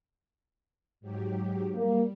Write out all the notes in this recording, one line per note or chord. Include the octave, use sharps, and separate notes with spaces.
G#2 F#3 G4
G3 A#3